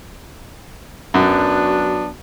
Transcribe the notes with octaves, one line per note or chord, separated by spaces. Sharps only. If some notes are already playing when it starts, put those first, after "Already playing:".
F#2 F#3 B3 D4 F#4